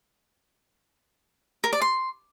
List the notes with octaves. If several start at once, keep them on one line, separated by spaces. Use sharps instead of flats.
A#4
D5
C6